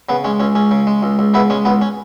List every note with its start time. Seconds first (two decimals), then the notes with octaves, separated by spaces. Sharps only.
0.09 C#3 B3
0.24 G#3 C#4
0.40 C#2 C#4
0.55 C#2 C#4
0.71 C#3
0.87 G#3
1.03 C#2
1.19 C#2
1.34 C#3 B3 E4
1.50 G#3 C#4
1.65 C#2 B3
1.81 C#4